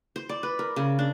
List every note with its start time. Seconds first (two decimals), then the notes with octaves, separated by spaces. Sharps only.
0.16 C5
0.29 D5
0.43 B4
0.59 A#4
0.76 C#3
0.99 D4